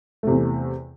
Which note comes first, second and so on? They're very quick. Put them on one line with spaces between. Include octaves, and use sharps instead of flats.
A3 C3 E2